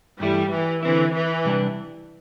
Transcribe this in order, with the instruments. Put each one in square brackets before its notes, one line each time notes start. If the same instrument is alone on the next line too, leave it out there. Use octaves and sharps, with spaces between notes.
[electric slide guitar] G2 E3 A3 E4 [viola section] G3
[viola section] E3
[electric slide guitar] D3 C4 E4 [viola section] E3
[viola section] E3
[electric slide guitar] C3 G3 D4